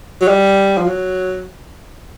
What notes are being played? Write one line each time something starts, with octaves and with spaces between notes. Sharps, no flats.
F#3
G3
F3
F#3